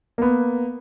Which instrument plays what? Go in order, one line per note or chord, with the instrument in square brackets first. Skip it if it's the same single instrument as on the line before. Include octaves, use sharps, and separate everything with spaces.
[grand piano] A#3 B3